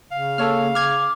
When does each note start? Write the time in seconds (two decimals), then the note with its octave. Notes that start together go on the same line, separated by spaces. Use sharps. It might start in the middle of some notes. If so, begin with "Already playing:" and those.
0.12 C#3 F5
0.38 A#3 A4 C#5 F6
0.75 D6 F6 G#6